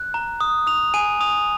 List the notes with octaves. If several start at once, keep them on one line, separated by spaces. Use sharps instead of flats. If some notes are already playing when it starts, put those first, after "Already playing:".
Already playing: F#6
A#5
D#6
D#6 F7
G#5 D#7
D#6 F7